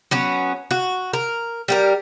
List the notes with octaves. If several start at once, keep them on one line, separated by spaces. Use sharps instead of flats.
F#3 B3 C#4
F#4
A#4
G3 G4 A#4